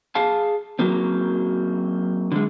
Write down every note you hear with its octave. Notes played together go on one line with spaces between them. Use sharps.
G#4 F5 A5
F#3 A#3 C4
D3 G#3